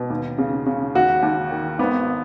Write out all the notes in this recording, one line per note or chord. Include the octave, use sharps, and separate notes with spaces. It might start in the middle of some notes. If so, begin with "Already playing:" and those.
Already playing: B2
D#2
C#3
C#3
D#2 F#4
D#2
D#3
G#1 B3